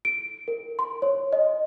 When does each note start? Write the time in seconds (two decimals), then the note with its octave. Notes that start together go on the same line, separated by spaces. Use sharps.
0.05 D7
0.48 A#4
0.79 C6
1.02 C#5
1.33 D#5